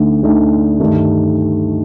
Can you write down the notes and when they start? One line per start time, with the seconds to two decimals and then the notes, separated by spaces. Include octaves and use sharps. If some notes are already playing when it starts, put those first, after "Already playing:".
Already playing: D2 D3 A3 D#4
0.23 D2 D3 A3 D#4
0.79 G2 D#3 A3